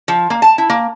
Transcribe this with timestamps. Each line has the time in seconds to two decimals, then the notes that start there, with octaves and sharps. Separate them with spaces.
0.08 F3
0.30 A#3
0.42 A5
0.58 E4
0.70 A#3